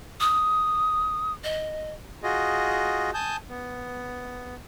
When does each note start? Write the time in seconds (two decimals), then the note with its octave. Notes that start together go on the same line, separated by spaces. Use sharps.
0.21 D#6
1.44 D#5
2.23 F4 F#4 G#4 D#5
3.14 G#5 A5 D#6 G6
3.49 B3